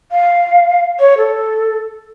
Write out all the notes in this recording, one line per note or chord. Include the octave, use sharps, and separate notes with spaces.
F5
C#5
A4